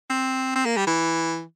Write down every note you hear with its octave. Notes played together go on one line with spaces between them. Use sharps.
C4
C4
A#3
G3
E3